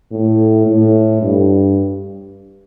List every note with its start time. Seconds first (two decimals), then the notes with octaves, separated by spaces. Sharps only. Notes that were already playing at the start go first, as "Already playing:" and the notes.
0.12 A2
0.66 A2
1.21 G2